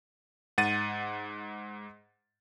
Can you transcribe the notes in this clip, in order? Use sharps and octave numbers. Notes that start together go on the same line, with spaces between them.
G#2 F#5 A6 D#7